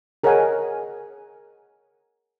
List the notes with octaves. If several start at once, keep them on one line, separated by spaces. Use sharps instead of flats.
G#4 A#4 C#5 D#5 F#5 G#5